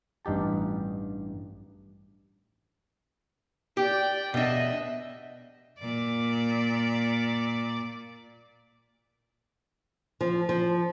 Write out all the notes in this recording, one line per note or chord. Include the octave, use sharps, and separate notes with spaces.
A1 G2 D#4 G4 A5
G4 D5 G5
B2 D4 D#5 E5
A#2 D5
F3
F3